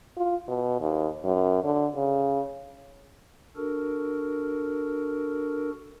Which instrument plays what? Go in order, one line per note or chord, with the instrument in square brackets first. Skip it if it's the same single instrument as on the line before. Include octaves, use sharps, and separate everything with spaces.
[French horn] F4
B2
D#2
F#2
D3
C#3
[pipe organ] D4 F#4 A4 A#4